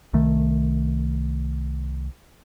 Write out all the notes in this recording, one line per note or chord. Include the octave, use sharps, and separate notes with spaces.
C2 D#3 A3